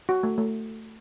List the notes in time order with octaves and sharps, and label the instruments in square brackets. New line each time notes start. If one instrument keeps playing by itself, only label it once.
[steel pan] F#4
A3
A3